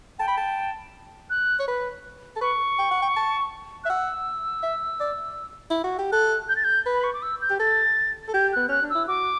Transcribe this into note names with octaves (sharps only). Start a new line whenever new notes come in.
G5 A5
B5
A5
F#6
C#5
B4
A4
B4 C#6
G5
F#5
G5
A5
E5 F#6
F#5 E6
E5
D5
E4
F#4
G4
A4 F#6
G6
A6
G6
B4
B5
C#6
D6
E6
G6
G4
A4 A6
A4
G4 G6
B3 F#6
C#4 F#6
D4
E4 E6
F#4 D6